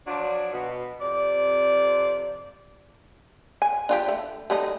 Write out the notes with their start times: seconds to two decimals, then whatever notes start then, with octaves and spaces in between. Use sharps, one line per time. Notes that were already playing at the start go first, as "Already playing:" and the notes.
0.07 F3 F#3 D4
0.53 B2
1.01 F2 C3 D5
3.62 G#5
3.89 D4 F4 G4
4.09 A3
4.50 G3 A3 D#4